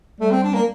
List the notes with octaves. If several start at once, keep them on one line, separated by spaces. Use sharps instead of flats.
G3 A3
C4
D4
A#3